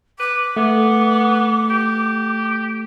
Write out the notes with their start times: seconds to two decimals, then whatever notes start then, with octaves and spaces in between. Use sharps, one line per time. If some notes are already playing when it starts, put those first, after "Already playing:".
0.19 B4 D6
0.57 A3 B3
1.70 G4